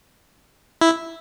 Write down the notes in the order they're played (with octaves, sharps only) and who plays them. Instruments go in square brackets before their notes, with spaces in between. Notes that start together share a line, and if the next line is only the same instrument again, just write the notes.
[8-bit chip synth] E4